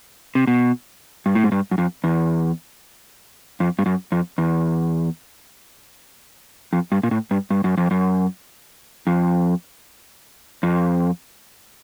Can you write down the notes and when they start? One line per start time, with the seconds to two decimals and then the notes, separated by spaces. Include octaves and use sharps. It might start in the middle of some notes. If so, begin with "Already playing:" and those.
0.35 C3
0.47 B2
1.26 G2
1.35 A2
1.44 G#2
1.52 G2
1.71 F#2
1.78 F2
2.04 E2
3.60 F2
3.79 G2
3.86 F#2
4.12 F2
4.38 E2
6.73 F2
6.92 G2
7.03 A#2
7.11 A2
7.31 G2
7.50 G2
7.64 F#2
7.78 F2
7.91 F#2
9.07 F2
10.63 F2